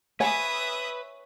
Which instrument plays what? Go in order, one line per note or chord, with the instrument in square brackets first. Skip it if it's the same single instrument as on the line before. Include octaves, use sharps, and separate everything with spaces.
[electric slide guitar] B4 [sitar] C#5 [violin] E5 D#6 [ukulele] G#5